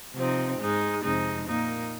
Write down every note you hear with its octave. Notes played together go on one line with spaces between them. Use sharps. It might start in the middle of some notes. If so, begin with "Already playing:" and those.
C3 F3 C4 D#4
G#2 G#3 D#4
F2 C3 G#3 D#4
A#2 A#3 D#4